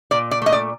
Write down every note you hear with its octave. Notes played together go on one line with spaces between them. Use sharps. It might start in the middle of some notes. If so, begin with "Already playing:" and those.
A#2 D5
D5
A3 D#5
D5